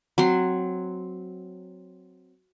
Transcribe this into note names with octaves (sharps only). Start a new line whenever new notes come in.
F#3 C4 C6